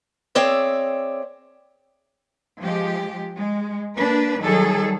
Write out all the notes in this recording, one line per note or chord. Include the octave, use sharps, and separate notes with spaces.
C4 G#4 C#5 D5 E5
F3 G#3 G4
G#3
A#3 D4 B4
D#3 F#3 G3 G#4 A4